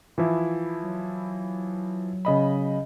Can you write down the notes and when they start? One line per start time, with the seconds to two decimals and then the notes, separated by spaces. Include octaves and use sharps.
0.18 E3 F3 E4
0.83 F#3
2.25 C#3 D#5 B5